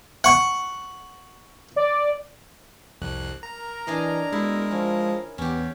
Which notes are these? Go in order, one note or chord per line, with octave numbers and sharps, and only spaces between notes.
F#5 C#6
D5
C2 F2 F#6
A#4 A#5
E3 D4 G#4 D#5
B2 G#3 E4
F3 C#4
E2 B3 C#4 G4